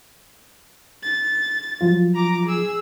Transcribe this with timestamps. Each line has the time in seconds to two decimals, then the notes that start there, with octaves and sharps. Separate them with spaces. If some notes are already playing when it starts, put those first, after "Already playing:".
1.03 A6
1.81 F3 F#3 F4
2.15 A#5 D6
2.46 G#4 E6